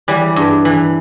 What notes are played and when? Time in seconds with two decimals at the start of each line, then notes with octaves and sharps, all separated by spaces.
0.08 E3 G3
0.36 G2
0.65 E3